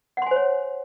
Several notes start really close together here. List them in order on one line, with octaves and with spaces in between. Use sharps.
F#5 C6 G#5 C5 C#5